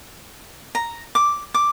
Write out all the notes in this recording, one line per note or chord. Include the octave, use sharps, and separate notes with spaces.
A#5
D6
D6